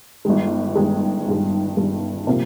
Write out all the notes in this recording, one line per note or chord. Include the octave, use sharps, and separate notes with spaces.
G1 G2 D#3 G#3
G1 G2 D#3 G#3
G1 G2 D#3 G#3
G1 G2 D#3 G#3
C3 F3 A#3